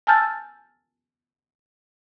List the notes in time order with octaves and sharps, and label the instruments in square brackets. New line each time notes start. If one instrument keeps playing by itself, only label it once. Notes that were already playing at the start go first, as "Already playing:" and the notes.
[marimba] G#5 A5 E6 F6 G6 A6